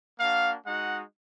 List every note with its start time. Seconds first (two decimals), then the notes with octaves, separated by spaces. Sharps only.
0.19 A#3 D4 F#4 F5
0.66 G#3 D#4 F#4 F#5